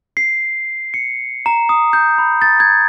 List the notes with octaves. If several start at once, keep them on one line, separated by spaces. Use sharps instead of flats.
C7
C#7
A#5
D#6
G6
B5
A6
G#6